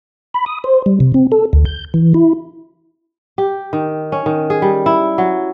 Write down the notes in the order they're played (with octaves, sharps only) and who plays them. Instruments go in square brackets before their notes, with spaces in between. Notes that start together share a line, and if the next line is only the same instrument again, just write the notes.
[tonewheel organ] B5
D#6
C5
G3
C3
C4
A4
D2
G6
E3
E4
[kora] G4
D#3
C#4
D#3
G#4
G3
E4
F#3